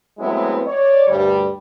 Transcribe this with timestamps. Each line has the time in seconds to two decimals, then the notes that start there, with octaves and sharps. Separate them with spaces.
0.19 F#3 G#3 A3 B3 C4 E4
0.65 C#5 D5
1.08 D2 G2 G3